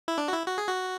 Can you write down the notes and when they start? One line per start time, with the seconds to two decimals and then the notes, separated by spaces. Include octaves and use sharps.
0.08 E4
0.18 D4
0.28 F#4
0.33 E4
0.48 F#4
0.58 G#4
0.69 F#4